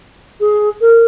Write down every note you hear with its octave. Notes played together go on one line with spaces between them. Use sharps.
G#4
A#4